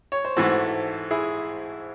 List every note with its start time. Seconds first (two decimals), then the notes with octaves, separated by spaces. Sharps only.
0.12 C#5
0.25 C5
0.37 G#2 E3 A3 C4 F#4 A4
1.11 E4 G#4